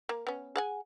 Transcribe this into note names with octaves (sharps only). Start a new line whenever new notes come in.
A#3
B3 C#4
G#4 F#5 G#5